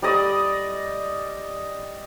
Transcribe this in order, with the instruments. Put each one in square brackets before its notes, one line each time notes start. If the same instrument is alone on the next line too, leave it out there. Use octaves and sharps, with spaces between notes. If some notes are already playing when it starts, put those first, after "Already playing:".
[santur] G3 D5 D#5